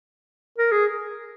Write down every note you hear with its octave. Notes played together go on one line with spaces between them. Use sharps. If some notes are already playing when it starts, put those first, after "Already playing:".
A#4
G#4